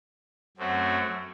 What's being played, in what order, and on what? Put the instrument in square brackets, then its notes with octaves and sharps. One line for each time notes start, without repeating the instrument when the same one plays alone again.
[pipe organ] F#2 F#3 A3 C4 F#4